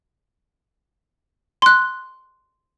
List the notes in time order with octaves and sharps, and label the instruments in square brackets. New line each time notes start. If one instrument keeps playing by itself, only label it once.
[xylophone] C6 F#6